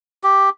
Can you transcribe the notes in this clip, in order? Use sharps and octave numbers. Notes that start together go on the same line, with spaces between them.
G4